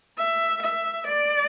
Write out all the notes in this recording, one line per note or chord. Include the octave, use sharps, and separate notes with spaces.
E5
E5
D5